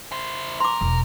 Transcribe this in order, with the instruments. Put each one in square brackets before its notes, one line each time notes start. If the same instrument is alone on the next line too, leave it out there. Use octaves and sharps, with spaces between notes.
[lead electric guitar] E4 C5
[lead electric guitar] A#4 [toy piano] C6 D6
[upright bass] E1